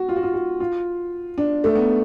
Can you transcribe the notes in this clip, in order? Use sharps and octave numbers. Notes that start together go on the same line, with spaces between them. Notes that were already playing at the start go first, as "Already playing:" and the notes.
Already playing: F#4
F4
F#4
F4
F#4
F4
D4
A3
B3